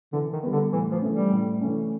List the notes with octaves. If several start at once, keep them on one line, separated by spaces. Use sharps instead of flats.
D3 E3
D#3
G3 B3
D3
A2 E3
F3
E3 A3 C#4
G3
A2
E3 A3 C#4